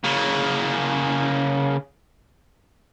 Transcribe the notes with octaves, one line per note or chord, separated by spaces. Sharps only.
C#3 A#3